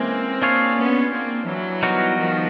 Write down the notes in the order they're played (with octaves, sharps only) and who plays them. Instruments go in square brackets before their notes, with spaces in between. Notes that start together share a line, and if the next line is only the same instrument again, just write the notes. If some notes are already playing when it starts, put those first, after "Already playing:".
Already playing: [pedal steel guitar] E3 G#3 C#4 [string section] A#3 C4
[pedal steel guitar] D4 F4 G#4 C#5 F5
[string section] B3 C#4
A#3 C4
E3 F#3
[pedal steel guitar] G3 B3 D#4 F#4 A#4
[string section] D#3 F3